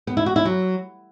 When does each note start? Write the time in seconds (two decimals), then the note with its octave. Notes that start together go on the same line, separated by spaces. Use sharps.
0.07 B3
0.17 E4
0.26 F#4
0.36 E4
0.45 F#3